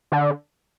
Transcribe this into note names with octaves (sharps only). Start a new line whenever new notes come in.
D3